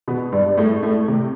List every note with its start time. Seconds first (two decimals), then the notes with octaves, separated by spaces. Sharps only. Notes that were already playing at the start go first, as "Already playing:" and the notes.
0.08 B2 B3
0.32 G2 G3
0.57 A2 A3
0.83 A2 A3
1.08 C3